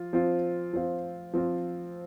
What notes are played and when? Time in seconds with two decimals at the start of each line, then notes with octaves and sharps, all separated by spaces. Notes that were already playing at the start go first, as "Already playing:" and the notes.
Already playing: F3 F4
0.13 F3 C4 F4
0.73 F3 C4 F4
1.34 F3 C4 F4